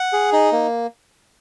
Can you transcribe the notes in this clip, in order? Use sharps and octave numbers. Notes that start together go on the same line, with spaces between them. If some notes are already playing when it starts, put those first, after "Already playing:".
Already playing: F#5
G#4
D#4
A#3